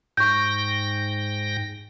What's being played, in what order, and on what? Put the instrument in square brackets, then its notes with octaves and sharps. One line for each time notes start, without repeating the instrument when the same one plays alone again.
[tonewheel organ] G#2 G5 A#6 [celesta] C#6 G6